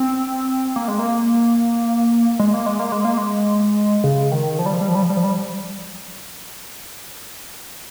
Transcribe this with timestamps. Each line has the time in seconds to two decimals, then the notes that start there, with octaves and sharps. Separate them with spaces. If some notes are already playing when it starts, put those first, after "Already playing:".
Already playing: C4
0.76 A#3
0.88 G#3
0.99 A#3
2.39 G#3
2.54 A#3
2.66 G#3
2.79 A#3
2.92 G#3
3.05 A#3
3.18 G#3
4.04 C#3
4.32 D#3
4.59 F3
4.66 G3
4.73 F3
4.81 G3
4.89 F3
4.95 G3
5.02 F3
5.10 G3
5.17 F3
5.24 G3